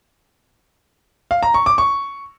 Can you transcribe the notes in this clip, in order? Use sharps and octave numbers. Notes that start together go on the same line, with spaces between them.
F5
A#5
C#6
D6
C#6